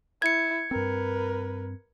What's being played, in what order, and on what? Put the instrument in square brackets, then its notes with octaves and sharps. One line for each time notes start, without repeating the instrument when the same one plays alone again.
[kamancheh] E4 [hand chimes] G#6 C#7
[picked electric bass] G2 C4 [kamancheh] A#4 B4